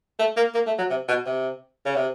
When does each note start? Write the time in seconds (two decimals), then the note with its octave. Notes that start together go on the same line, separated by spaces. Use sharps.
0.19 A3
0.36 A#3
0.54 A#3
0.67 A3
0.78 F#3
0.90 C3
1.08 B2
1.26 C3
1.85 C#3
1.96 C3